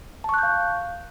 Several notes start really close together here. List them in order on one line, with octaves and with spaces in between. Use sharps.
A5 C#6 F#6 G6 F5